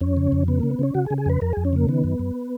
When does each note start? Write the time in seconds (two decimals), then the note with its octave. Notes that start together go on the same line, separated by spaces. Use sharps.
0.01 F2 C#4
0.17 C#3
0.32 F2
0.48 C#3 B3
0.60 C#3 A#3
0.71 B3
0.79 C#3 C#4
0.95 C#3 F#4
1.06 G#4
1.10 C#3
1.18 G#4
1.26 F2 B4
1.41 F2 A#4
1.53 F2 G#4
1.65 C#4
1.73 C#3 A#3
1.88 D#3 B3
2.04 F#2
2.19 F#2